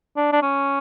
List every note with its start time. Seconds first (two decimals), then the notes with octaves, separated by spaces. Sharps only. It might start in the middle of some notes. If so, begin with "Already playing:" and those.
0.17 D4
0.33 D4
0.43 C#4